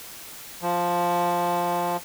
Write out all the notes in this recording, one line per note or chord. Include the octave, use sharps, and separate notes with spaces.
F3